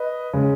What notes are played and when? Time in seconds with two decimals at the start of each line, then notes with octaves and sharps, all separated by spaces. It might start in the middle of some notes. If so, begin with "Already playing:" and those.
Already playing: B4 D#5
0.33 C#3 G#3